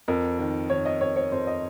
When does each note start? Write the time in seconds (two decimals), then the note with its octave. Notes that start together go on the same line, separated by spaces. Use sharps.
0.08 F2 A#4
0.39 D#3
0.70 D#3 C#5
0.85 D#5
1.01 F2 C#5
1.16 C#5
1.32 F2 C5
1.47 D#5